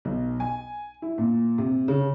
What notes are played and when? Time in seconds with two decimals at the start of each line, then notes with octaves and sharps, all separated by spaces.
0.05 B1
0.40 G#5
1.02 E4
1.18 A#2
1.58 C3
1.88 C#3